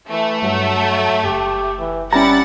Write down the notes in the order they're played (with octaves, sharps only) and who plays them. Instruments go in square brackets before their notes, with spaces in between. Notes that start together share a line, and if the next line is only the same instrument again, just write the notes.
[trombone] E3 [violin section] A3
[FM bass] G2 [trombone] F#3
[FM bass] F#1 [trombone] G4
[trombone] E3
[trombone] G3 [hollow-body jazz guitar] C#4 A#5 [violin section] E4 F#5 A6